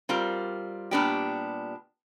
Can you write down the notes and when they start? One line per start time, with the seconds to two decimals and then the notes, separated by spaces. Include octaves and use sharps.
0.09 G3 C4 F4 A#4
0.91 A#2 G3 B3 D4 G4